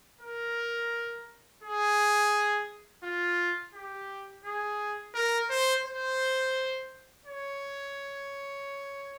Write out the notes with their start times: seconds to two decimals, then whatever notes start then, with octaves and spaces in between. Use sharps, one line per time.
0.21 A#4
1.63 G#4
3.03 F4
3.74 G4
4.45 G#4
5.15 A#4
5.50 C5
5.85 C5
7.25 C#5